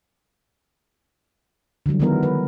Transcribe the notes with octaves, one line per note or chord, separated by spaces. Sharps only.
D3 E3 F#3 G3
D#3 F#3 G#3 B3 E4 A#4
B4